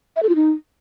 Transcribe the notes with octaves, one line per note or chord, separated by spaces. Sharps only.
E5
A4
F4
D#4